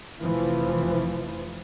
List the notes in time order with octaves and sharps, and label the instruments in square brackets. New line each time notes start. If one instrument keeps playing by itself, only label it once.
[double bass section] F1 E3 F3